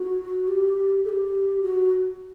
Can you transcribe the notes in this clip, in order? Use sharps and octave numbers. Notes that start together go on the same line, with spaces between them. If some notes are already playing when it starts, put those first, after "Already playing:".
Already playing: F#4
G4
A4
G4
F#4